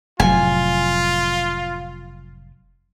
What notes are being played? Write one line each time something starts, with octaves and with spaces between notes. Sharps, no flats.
F1 A2 F#3 F4 G#5